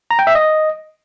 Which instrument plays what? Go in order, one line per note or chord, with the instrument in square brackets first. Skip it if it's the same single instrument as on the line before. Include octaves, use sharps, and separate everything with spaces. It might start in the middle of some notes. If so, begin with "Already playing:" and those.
[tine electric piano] A#5
G5
E5
D#5